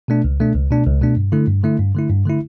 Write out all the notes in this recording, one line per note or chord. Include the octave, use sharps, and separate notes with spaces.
B2 A3 D4
C#2
B2 A3 D4
C#2
B2 A3 D4
C#2
B2 A3 D4
G2
D3 A3 E4
G2
D3 A3 E4
G2
D3 A3 E4
G2
D3 A3 E4